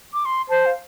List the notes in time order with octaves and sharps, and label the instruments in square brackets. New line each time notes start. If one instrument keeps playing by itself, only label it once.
[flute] D6
C6
[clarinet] C5 [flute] A5
[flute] F5